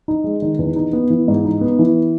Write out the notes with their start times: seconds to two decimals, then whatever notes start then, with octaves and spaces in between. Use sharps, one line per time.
0.08 D#4
0.24 G#3
0.42 D#3
0.59 E2
0.76 D#4
0.93 B3
1.10 E3
1.28 G#2
1.44 D#4
1.61 B3
1.79 E3